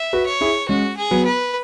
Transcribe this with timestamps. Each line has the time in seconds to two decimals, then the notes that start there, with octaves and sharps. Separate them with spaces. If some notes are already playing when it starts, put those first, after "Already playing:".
Already playing: E5
0.13 F#4 B4
0.26 C#5
0.41 E4 G#4
0.69 G#3 C#4 F#4
0.97 G#4
1.11 F#3 B3
1.25 B4